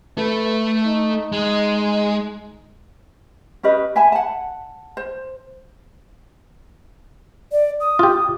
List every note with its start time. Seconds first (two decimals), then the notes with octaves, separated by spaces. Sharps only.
0.18 A3 A4 B4
0.87 D#4
1.32 G#3
3.63 C#4 G4 B4 D#5
3.96 E5 G#5 A5 B5
4.12 F#5 A5
4.97 C5
7.52 D5
7.80 D#6
7.99 F4 G4